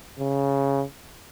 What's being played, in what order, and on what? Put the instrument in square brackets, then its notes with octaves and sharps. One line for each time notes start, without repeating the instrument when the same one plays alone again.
[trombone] C#3